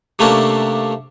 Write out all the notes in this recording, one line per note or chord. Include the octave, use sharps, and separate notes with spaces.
C3 A3 A#3 C#4 D4